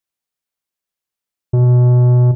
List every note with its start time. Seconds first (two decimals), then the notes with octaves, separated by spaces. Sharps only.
1.53 B2